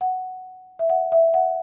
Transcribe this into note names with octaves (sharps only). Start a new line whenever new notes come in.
F#5
E5
F#5
E5
F#5